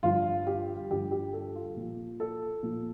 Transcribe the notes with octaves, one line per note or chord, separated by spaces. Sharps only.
G2 D3 F3 F4
G4
G2 D3 F3 G4
G4
A4
F4
A#2 F3
A4
A#2 F3